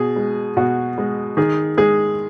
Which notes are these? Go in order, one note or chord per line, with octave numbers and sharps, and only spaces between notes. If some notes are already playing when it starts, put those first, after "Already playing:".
Already playing: B2 G#4
G#3
B2 F#4
G#3
D#3 G#4
G#3 G#4